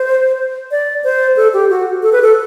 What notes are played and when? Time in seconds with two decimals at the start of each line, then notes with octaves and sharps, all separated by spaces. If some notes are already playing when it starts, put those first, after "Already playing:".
Already playing: C5
0.71 D5
1.04 C5
1.36 A4
1.53 G4
1.70 F#4
2.03 A4
2.12 B4
2.22 A4